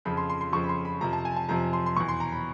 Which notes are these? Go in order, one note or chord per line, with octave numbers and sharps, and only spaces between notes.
F2 C#3 F3 B5
C6
C6
C6
F2 C#3 F3 C#6
B5
C6
B5
F2 C3 F3 A#5
A5
G#5
A5
F2 C3 F3 A#5
C6
C6
E2 B2 C#6
C6
A#5
B5